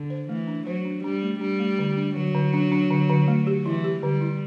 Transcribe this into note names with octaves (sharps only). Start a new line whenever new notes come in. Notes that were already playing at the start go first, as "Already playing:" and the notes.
Already playing: D3
C5
E3 A3
D4
F#3 C5
D4
G3 D4
A3
G3 D4
A3
D3
D4
D3 F#3
D3
D4
D4
D3
D3
A3
G4
E3 E4
G4
D3 G3
E4